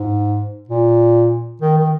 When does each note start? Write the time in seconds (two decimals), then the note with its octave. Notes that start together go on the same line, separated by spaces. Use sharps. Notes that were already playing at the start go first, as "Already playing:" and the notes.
Already playing: G#2
0.69 A#2
1.62 D#3
1.78 D#3